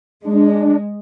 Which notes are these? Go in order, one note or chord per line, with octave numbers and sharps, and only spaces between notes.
G#3 D4